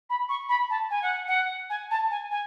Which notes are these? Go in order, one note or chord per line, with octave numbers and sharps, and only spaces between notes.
B5
C#6
B5
A5
G#5
F#5
F#5
G#5
A5
G#5
G#5